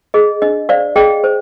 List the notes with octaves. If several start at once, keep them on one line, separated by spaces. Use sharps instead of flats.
G#4 D#5
D4 D#5
C5 D5 F5
G#4 D#5 G5
C5